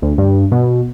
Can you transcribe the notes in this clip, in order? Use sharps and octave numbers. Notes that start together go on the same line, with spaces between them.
D2
G2
B2